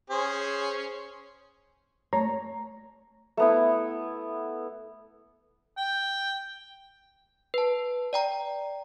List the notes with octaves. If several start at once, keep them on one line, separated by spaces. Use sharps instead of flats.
C#4 G#4 C5
A3 C#5 A#5
A3 B3 E4
G5
B4 A5
D5 G5 A#5